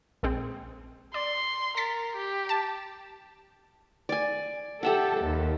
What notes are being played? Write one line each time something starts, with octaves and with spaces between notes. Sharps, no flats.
A#1 G#3 C4
D5 C6
A#4 A6 B6
G4
A5
D5 G#5
G4 A4 E5 F#5
D#2